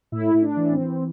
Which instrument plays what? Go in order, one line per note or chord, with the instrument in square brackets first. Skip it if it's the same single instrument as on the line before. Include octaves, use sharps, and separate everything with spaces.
[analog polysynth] A2 E4
A2
D4
E3
C4
E3